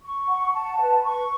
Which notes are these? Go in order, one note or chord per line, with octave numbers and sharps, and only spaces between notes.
C#6
F#5
A5
B4
C#6